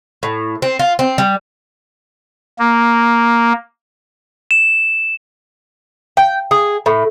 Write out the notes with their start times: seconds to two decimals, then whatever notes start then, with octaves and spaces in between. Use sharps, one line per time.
0.23 A2
0.62 C4
0.79 F4
0.99 C4
1.18 G3
2.59 A#3
4.51 E7
6.17 G5
6.51 G#4
6.86 A2